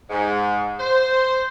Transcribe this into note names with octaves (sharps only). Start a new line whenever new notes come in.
G#2
C5